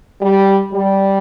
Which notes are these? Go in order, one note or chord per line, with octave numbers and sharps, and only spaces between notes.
G3
G3